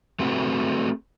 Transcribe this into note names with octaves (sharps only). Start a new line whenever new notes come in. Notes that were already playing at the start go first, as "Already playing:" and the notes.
A3 C4 F#4 G#4 A4 B4